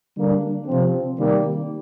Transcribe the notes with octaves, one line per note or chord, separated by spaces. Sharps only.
D3 G3 A#3 D4
C3 F3 C4
C3 D#3 G3 A#3